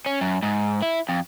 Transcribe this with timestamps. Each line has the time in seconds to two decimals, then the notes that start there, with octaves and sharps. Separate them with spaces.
0.06 C#4
0.21 F#2
0.43 G#2
0.82 E4
1.09 F2